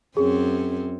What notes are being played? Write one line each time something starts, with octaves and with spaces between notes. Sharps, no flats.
F#2 C4 C#4 G#4